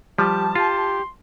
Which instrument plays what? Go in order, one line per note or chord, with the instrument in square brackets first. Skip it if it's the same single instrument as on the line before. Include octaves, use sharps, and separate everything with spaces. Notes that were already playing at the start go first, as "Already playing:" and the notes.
[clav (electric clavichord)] F3 G3 [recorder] G4 [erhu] A5
[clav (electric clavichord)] F4 [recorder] G4 [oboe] C6